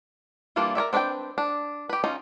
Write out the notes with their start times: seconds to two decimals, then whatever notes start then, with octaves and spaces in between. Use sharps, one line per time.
0.56 E3 G3 A#3 D4 F4
0.75 A#4 C#5 D5 E5
0.93 C4 D4 B4 C5 G5
1.38 D4
1.89 G4 B4
2.04 C#4 D#4 F4